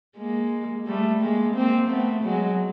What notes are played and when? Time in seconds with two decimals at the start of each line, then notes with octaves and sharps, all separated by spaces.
0.17 G#3 A#3
0.87 G3 A3
1.21 G#3 A#3
1.55 A#3 C4
1.89 A3 B3
2.24 F#3 G#3